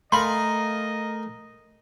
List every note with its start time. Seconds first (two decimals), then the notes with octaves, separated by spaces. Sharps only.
0.12 A3 A#4 D#5 F5 G#5 B5 C6